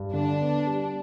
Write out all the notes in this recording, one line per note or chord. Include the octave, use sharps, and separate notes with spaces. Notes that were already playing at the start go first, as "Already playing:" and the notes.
Already playing: G2
D3 D4
B3
G3